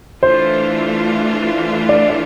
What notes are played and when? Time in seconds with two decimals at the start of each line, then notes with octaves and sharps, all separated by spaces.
0.22 E3 A3 D4 F4 C5
1.89 D5
2.10 D5